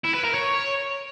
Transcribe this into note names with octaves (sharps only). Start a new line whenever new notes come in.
E4
B4
A#4
C#5